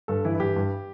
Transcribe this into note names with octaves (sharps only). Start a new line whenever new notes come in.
G2 A4
E3 E4
E4
G2 G4
G2